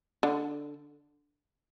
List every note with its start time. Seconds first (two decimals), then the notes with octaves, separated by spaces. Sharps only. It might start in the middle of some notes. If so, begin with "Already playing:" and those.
0.23 D3